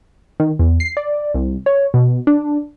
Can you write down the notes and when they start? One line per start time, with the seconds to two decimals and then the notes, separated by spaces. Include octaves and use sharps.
0.40 D#3
0.59 E2
0.80 C7
0.97 D5
1.34 C2
1.66 C#5
1.94 B2
2.27 D4